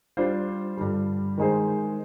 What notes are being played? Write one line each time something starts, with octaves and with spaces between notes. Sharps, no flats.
G3 D4 F4 C5
G2 D3 G3
D#3 G#3 D#4 G#4 C5